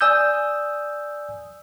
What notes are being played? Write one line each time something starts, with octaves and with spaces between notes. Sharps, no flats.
D5 G#5 D#6 E6 G6